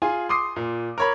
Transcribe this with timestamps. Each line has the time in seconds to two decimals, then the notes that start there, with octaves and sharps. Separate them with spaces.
0.02 F4 G#4 G#5
0.29 C6 D6 D#6 C7
0.56 A#2
0.98 A#4 C#5 B5